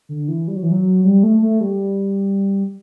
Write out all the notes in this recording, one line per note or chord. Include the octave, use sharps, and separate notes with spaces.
D3
E3
G3
F#3
E3
F#3
G3
A3
A3
G3